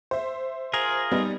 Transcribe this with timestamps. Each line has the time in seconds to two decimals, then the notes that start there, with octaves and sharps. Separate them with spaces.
0.11 C5 E5
0.73 F4 G#4 A#4
1.11 G3 B3 D#4